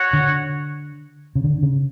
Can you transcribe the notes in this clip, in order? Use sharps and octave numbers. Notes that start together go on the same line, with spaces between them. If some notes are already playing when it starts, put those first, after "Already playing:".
Already playing: F#4 C#5 F#5
D3
C#3
D3
C#3